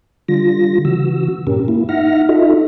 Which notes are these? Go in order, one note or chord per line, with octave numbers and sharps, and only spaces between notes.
D3 G3 F4 A#6
C#3 E3 F#4 E6
G2 A#2 C#4 G4 A#4
A#3 E4
D#4 E5 F#5 F6 A#6
D#4 F4 F#4 A4 D#5 E5